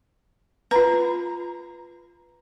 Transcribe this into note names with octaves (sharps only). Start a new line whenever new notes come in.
F4 B4 A#5